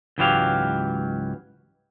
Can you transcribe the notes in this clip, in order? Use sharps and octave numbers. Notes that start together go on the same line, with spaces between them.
C#2 G#2 E3 F#3 G4 F5